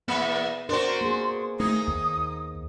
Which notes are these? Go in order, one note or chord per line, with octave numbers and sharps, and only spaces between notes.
E2 A#3 B3 E5
D4 F#4 A#4 C5 C6
A#3 G#4
A3 D#4 D#6
D#2